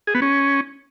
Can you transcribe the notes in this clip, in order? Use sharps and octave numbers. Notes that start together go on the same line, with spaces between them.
G#4
B3
C#4